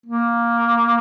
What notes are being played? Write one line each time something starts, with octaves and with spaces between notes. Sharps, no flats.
A#3